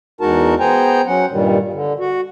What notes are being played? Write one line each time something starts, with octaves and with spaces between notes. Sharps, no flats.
E2 G#3 D#4 F#4 A#4 A5
B3 G#4 C5 G5 G#5 A#5
F#3 C#4 F#5
G2 A#2 D#3 G3
D3
F#4